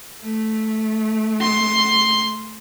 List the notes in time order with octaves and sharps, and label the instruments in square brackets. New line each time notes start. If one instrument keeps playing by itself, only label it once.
[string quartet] A3
[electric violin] C6